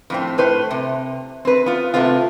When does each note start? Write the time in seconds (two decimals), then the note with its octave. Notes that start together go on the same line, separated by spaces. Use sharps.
0.10 F2 A2 C4
0.38 A2 B4 C5
0.71 C3
1.45 C4 B4
1.66 B3 F4
1.94 C3 A3 B3 C4 F4